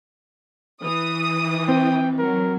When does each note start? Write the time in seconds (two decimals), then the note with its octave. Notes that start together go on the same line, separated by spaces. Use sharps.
0.83 E3 D#6
1.68 C4 G5
2.18 F#3 A#4